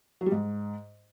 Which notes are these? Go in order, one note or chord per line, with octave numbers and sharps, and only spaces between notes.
F#3
G3
G#2